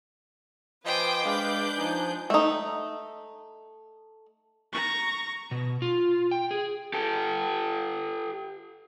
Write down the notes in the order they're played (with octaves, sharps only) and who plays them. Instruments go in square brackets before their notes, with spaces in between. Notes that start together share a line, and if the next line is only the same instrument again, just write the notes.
[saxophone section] F3 D#5 [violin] B4 D6 [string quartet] C5 G5 G#5
[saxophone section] G#3 [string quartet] D4 G6 [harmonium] F5
[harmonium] F3 G#5 [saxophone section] D#4
[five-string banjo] A3 D#4
[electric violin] A#5 C#6
[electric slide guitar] B2
F4
G5
G#4
[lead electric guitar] G4 A4